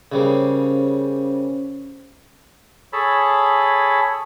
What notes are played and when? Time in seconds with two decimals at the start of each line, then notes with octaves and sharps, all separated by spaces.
0.12 C#3 G3 A#3 C#4 C5 C#5
2.93 G#4 A4 C#5 A5 B5